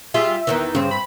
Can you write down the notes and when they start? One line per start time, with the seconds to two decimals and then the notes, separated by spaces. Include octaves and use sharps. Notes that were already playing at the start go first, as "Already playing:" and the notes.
0.14 G3 F4 G#4 E5
0.47 E2 D#3 E3
0.75 G2 C#3 C4
0.91 B5